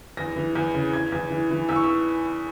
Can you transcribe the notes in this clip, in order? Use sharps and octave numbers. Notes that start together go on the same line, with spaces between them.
E2 A#6
E3
E2
C#3
E2 G#6
E2
E3
E3
E2 E6
C#6
E6